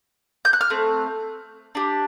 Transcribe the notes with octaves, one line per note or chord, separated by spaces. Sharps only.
G6
F#6
F6
A3 C4
D4 G4